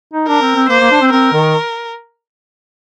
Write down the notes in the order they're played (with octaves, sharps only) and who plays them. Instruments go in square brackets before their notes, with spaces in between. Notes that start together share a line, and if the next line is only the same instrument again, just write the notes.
[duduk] D#4
[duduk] D4 [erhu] A#4
[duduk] C4
C4
[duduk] A#3 [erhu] C5
[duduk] A#3
D4
C4
[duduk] C4 [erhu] A#4
[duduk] D#3